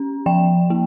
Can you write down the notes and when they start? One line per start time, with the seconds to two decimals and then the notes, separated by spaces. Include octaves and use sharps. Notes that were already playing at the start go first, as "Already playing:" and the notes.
Already playing: C#4
0.26 F3 G5
0.70 A#3